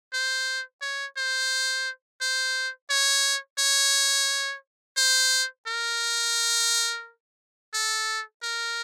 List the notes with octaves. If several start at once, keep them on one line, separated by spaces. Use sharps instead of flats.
C5
C#5
C5
C5
C#5
C#5
C5
A#4
A4
A#4